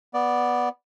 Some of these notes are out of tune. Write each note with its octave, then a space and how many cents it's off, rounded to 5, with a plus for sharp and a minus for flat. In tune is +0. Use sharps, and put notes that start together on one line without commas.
B3 -10 D5 +0